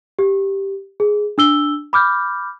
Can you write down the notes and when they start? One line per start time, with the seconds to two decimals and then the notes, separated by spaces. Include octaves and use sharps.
0.19 G4
1.00 G#4
1.38 D4 E6 G7
1.93 B5 D6 F6 G6